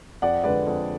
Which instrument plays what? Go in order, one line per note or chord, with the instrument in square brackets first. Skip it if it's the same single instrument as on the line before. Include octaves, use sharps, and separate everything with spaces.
[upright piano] F2 D5 F#5
D3 G#3 B4 D5
F2